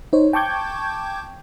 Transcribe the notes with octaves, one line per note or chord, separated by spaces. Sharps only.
D#4 C5 C#5
G5 A5 C#6 D6 G6 G#6